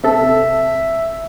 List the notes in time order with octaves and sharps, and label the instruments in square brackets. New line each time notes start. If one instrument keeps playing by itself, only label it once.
[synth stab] C3 A4 [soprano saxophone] E5